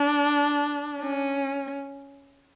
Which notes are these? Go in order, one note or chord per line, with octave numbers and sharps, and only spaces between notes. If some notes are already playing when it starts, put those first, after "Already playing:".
Already playing: D4
C#4